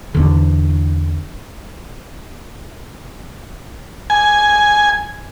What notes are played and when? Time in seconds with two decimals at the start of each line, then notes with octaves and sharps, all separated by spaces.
0.15 E2 D3
4.10 G#5